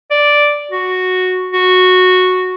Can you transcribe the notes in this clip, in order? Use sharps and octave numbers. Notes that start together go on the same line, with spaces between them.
D5
F#4
F#4